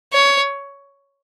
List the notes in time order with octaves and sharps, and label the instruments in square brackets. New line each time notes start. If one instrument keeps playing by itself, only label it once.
[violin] C#5